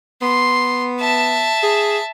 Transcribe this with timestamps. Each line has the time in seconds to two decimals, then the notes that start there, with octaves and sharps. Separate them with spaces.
0.22 B3 C6
1.00 E5 A5
1.63 G#4